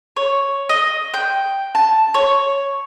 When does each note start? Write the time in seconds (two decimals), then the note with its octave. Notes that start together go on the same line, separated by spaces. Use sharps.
0.16 C#5
0.69 D#5
1.14 G5
1.75 A5
2.14 C#5